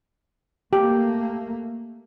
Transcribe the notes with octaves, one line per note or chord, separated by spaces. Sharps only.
A3 A#3 G4